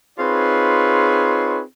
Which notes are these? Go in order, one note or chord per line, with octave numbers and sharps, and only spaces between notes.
C4 D#4 F4 G#4 B4 C#5